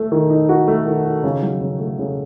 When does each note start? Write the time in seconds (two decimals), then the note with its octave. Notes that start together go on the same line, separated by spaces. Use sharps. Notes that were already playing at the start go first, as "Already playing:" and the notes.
Already playing: A3
0.12 D#3
0.30 D#4
0.49 F#4
0.68 A3
0.86 D#3
1.05 D#4
1.24 C#3
1.42 F#3
1.61 C#3
1.80 A3
1.99 C#3